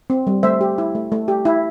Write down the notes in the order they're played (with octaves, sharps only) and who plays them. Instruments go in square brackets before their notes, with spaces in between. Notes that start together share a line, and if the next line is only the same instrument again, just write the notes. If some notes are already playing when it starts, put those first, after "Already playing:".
[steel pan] C4
G3
A3 C5 E5
G4
E4
A3
A3
G4
E4